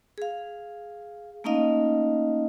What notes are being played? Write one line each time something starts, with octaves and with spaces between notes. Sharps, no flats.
G#4 F5
A3 A#3 C#4 D#4 D#5 F5